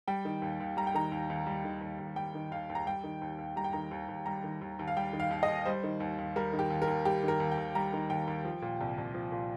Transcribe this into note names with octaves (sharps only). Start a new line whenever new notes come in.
G3 G5
D#3
D#2
D#2
G3 A#5
G5
D#3 A#5
D#2
D#2
G3
D#3
D#2
D#2
G3 G5
D#3
D#2 F5
D#2
A#5
G3 G5
D#3
D#2
D#2
G3 A#5
G5
D#3 A#5
D#2
D#2
G3 A#5
D#3
D#2
D#2
F5
G3 G5
D#3
F5
D#2
D#5
D#2
G3 C5
D#3
D#2
D#2
G3 A#4
D#3
G4
D#2
A#4
D#2
G3 G4
D#3 A#4
D#2
G5
D#2
G3 A#5
D#3
D#2 G5
D#2
F3
A#2
C2
C2
F3
A#2